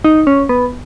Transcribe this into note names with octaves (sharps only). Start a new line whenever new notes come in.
D#4
C#4
B3